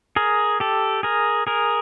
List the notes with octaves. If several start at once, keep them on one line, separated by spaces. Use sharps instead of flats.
G#4 A#4
G4 A4
G#4 A#4
G#4 A#4